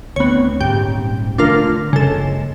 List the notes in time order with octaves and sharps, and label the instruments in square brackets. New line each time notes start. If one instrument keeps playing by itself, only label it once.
[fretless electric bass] D2 C4 [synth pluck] B3 C#5
[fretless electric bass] D#1 G#2 [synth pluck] G4 G5
[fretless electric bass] D3 D#3 A3 [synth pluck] D4 F4 A#4
[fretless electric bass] F#1 G#3 [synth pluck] C#3 A4